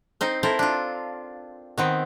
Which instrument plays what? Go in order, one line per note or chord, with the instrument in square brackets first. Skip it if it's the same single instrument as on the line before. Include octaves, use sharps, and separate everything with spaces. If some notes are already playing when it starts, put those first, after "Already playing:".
[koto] C4 D#4 C5
C4 E4 A4 A#4
D4 F4
D#3 B3 C4